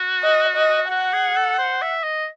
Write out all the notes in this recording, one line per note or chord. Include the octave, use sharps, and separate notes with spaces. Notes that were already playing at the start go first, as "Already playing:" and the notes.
Already playing: F#4
D#5
D#5
F#4 F#5
G#4
A4
C5
E5
D#5